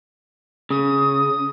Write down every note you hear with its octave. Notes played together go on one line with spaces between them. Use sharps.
C#3 D#6